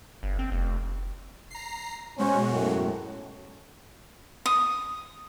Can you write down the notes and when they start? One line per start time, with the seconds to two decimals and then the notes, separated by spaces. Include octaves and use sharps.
0.23 G1
0.39 C4
0.52 F1
1.50 A#5 C7
2.18 B2 G#3 C#4 F#4 C5
2.50 F#2 A2
4.46 D#6